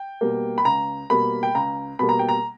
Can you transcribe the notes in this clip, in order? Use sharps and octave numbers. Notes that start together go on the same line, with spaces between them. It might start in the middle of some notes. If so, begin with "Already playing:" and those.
Already playing: G5
B2 G3 A#3
B5
C#2 A#5
B2 G3 A#3 B5
G5
C#2 A#5
B2 G3 A#3 B5
A#5
G5
A#5